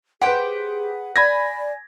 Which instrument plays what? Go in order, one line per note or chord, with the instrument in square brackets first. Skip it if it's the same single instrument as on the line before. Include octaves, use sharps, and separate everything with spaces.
[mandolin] G4 C5 G5 [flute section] G#4 [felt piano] B4 F#5
[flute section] D5 [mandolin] G#5 [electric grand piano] B5 G#6 A#6